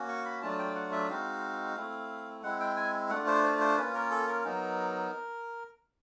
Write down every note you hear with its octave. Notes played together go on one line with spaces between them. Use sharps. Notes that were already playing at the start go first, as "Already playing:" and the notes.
Already playing: A#3 C#4 F#4
C#6
B5
F#3 A3 D4 F4 A5
G5
F#5
E5
G#3 C4 D#4 F#4 F5
A3 C4 E4
G#3 C4 E4 F#5
G5
G#5
A3 D4 F4 F#5
C5
C5
C5
A#3 C#4 F4 B4
A#4
A4
A#4
F#3 B3 D#4